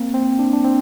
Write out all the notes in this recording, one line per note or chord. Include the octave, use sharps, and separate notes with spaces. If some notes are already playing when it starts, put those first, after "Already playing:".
Already playing: A#3 C4
C4
D4
D4
C4